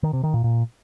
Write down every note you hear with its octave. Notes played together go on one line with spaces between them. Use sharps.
D#3
C3
D#3
A#2
A#2